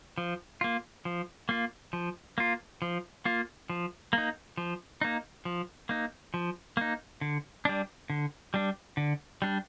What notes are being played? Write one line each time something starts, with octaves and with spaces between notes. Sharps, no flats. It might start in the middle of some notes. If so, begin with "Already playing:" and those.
F3
A#3 F4
F3
A#3 F4
F3
A#3 F4
F3
A#3 F4
F3
A#3 D#4
F3
A#3 D#4
F3
A#3 D#4
F3
A#3 D#4
D3
G3 D4
D3
G3 D4
D3
G3 D4